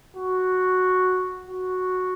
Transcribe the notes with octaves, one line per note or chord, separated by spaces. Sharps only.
F#4
F#4